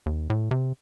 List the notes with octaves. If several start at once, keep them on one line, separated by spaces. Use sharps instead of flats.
D#2
A2
C3